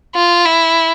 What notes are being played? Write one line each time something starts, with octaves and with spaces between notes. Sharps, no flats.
F4
E4